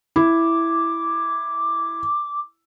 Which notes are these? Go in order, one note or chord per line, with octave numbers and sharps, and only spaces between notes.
E4 D6